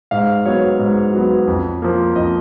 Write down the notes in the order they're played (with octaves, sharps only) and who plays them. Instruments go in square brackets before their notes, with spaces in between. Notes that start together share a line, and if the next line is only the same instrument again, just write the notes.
[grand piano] G#2 F5
F#3 B3 C#5
G#2
F#3 B3
F2
F3 A#3
F2 D#5